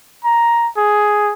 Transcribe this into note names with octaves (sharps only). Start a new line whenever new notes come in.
A#5
G#4